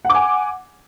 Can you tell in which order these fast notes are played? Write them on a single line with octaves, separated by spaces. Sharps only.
F#5 D6 G#5